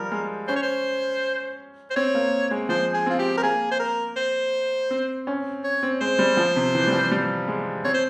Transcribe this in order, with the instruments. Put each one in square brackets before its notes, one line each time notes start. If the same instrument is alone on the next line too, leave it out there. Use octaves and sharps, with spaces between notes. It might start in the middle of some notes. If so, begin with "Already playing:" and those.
Already playing: [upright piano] F3 G3 [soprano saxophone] A#4
[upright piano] G#3
[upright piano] C#4 [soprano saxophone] C5
[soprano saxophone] C#5
C5
C5
[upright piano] C4 [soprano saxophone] C#5
[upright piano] A#3
G#3
[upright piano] F3 [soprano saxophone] C5
[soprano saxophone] G#4
[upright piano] C4 [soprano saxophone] F4
[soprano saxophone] G4
A#4
[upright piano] A#3 [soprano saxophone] G#4
[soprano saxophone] C5
A#4
C5
[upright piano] C4
C#4
[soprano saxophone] C#5
[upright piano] C4
[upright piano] G#3 [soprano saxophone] C5
[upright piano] G3
F3
C3
E3
G3
F3
G3
G#3
[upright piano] C4 [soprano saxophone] C#5
[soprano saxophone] C5